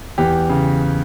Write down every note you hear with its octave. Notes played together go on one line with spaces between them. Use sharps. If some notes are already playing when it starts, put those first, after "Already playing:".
E2 G4
C#3